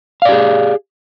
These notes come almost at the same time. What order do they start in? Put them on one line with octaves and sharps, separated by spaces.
F5 D5 G4 G#4